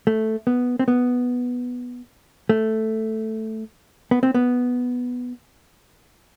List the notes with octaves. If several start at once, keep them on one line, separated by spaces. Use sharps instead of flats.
A3
B3
C4
B3
A3
B3
C4
B3